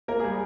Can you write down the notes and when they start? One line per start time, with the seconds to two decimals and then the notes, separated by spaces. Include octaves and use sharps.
0.08 A#3 A#4
0.20 G3 G#4